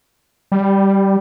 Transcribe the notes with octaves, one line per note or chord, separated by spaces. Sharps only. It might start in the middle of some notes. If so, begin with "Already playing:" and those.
G3